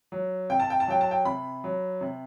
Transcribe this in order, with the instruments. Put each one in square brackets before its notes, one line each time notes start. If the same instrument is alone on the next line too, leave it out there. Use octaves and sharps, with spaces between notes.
[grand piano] F#3
C3 G5
A5
G5
A5
F#3 G5
A5
G5
C3 B5
F#3
C3